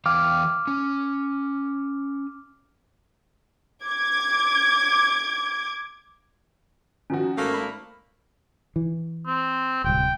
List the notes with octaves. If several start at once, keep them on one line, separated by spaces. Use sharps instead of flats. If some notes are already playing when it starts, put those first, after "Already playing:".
E3 F5 G5 D6 F6
C#4
D6 G#6
D#3 F3 C#4 F#4
G#1 A3 A#3 C7
B5
E3
C4
D1 C2 G5